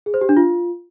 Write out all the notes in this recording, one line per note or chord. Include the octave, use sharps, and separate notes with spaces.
G#4
C5
G4
D4
F4